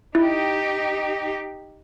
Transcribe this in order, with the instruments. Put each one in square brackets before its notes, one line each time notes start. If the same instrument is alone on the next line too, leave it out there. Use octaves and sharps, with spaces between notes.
[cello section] D#4 G4 [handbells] E4